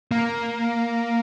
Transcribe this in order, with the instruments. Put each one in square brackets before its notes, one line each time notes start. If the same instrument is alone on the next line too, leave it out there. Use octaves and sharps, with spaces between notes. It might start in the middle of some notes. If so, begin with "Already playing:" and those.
[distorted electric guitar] A#3